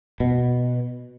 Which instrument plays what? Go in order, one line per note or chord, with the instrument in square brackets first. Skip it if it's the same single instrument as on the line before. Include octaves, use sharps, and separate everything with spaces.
[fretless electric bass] B2